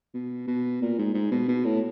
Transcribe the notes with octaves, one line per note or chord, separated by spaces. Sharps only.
B2
B2
A#2
G#2
G#2
B2
B2
A2